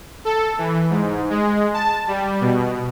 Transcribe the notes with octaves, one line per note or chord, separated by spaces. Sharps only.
A4
E3
G#2
G#3
A5
G3
B2